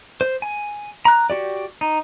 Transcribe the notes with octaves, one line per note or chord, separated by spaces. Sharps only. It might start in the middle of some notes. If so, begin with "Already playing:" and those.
C5
G#5
A#5 F#6
F#4 G4 D5
D#4